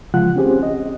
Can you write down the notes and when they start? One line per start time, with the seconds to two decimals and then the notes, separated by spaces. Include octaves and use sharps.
0.14 C#3 F3 G#3 F4 F#5 F#6
0.36 C4 C#4 G4 G#4 C5
0.63 D#5